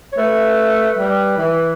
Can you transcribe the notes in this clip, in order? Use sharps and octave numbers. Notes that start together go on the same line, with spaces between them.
C#5
A3 B4
G3
E3